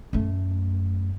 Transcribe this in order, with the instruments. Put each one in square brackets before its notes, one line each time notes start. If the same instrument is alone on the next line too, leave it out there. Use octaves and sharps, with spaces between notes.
[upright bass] F#2 A3